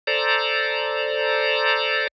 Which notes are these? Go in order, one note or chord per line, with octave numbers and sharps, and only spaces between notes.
A4 C5 D5 A#5